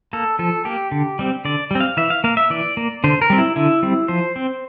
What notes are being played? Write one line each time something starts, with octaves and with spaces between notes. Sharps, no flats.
A#3 A4
F3 A4
A#3 G4
D3
G3 C4
D3 D5
G3 C4
F5
E3 E5
F5
A#3 F5
E5
E3 D5
A#3
D3 C5
A#4
G3 C4
E4
D3 E4
G3 C4
F3 C5
C4